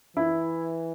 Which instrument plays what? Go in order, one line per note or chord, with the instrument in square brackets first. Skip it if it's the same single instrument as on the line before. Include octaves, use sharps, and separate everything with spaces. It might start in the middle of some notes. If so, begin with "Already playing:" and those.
[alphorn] E3 [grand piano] E4